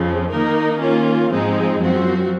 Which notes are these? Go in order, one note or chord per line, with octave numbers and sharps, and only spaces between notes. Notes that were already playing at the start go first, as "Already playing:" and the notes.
Already playing: F2 C#3 F3 C4
D#3 A#3 D#4 A#4
D#3 A#3 C#4 F4
G#2 F3 G#3 C4 D#4
F#2 F3 C4 F#4